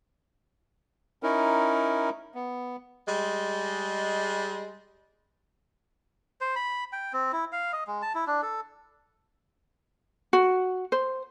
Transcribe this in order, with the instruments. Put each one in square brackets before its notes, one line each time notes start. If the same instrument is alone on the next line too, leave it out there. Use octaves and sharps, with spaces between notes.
[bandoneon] C#4 D#4 E4 A#4
B3
[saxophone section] G3 G#3
[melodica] C5
B5
G5
C4
E4
F5
D#5
G#3
A5
E4
D4
A4
[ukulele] F#4
C5